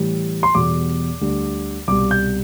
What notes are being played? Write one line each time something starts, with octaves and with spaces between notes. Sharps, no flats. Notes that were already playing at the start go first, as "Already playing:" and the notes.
Already playing: A2 E3 G3
C6
E2 B2 G3 D6
D2 D3 G3
C2 B2 G3 D6
G6